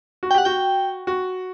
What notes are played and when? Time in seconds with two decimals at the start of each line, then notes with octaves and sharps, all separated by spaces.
0.23 F#4
0.31 G5
0.34 G4 F#5
0.45 F#4 G5
1.07 F#4